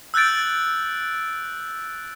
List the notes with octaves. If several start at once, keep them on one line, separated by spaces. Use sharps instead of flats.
E6 F#6 G6 A6 D7